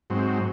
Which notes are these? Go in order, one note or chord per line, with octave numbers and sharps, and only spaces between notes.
G#2 F#3 C4